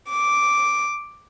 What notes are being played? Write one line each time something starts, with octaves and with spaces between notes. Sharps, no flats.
D6